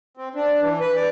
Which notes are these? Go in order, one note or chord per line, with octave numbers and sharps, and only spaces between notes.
C4
D4
E3
B4
D5